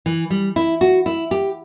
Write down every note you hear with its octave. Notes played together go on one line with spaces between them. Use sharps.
E3
G3
E4
F#4
E4
G4